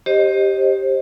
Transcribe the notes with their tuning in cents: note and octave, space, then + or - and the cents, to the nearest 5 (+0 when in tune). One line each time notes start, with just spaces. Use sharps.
G4 +0 C5 +25 D#5 +0